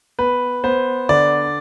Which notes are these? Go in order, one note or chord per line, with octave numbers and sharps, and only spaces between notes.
B3 B4
B3 C5
D3 D5